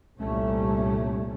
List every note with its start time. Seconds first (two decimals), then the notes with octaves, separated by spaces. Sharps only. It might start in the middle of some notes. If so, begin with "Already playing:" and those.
0.17 G1 C2 A#2 G3 A3 C#4